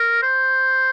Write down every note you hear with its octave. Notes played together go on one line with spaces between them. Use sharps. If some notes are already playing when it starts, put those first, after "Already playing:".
Already playing: A#4
C5